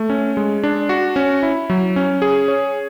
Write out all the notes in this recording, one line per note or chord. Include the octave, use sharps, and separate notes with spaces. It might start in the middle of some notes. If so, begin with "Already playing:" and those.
Already playing: A3
C#4
G#3
D4
F#4
C#4
E4
F#3
C#4
G#4
C#5